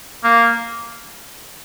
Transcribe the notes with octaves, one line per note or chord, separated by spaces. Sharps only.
A#3